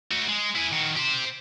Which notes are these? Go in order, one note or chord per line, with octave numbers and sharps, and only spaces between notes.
A3 F#4
G#3
E4 G#4
D#3 F#4
G4 C5